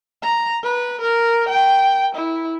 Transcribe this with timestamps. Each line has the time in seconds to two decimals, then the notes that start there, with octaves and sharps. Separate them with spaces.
0.23 A#5
0.64 B4
1.01 A#4
1.49 G5
2.15 E4